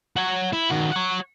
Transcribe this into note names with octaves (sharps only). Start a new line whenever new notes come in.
F#4 C#5
E4
D#3 F#4
C#5 F#5